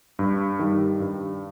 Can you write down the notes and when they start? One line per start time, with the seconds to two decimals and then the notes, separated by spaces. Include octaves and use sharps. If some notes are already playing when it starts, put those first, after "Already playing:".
0.19 G2
0.59 D#3 G3
1.00 G2